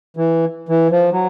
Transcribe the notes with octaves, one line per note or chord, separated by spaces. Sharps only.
E3
E3
F3
F#3